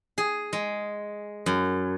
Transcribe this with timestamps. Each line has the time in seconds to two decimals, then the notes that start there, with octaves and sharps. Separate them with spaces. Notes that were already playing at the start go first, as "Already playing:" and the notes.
0.18 G#4
0.53 G#3
1.46 F#2